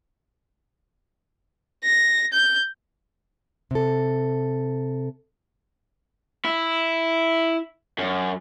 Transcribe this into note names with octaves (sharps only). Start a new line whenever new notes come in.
A#6
G6
C3 A4
E4
F#2